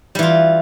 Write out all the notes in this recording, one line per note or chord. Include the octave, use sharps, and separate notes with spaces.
E3 G3 F4